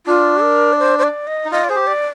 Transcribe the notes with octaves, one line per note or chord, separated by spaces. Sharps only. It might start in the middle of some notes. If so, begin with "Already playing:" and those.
D4 F4
A#4
D5
C5
C5
D5
D#5
D#4
F4 D#5
D5
G#4 C5
G4
D5